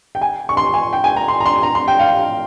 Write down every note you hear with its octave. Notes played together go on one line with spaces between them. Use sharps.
G5
G#5
C#6
C6
G#5
G5
G#5
A#5
C6
A#5
C6
A#5
C6
G5
F5